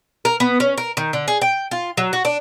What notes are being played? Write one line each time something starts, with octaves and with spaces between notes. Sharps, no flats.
A#4
B3
C#4
A#4
D#3
D3
G#4
G5
F4
F#3
F#4
D4